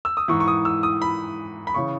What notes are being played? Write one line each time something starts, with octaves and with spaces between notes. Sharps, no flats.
E6
D#6
G#2 E3 C#6
C#6
D#6
E6
D#6
B5
B5
C#3 E3 C#6